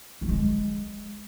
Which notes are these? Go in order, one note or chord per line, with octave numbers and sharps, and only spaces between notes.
G3
G#3